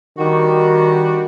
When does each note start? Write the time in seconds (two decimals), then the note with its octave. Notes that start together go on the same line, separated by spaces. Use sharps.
0.18 D#3 G3 D4 F#4